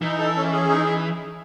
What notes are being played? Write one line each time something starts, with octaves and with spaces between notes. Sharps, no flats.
E3 D#4
A4
C#4
G#4
D#4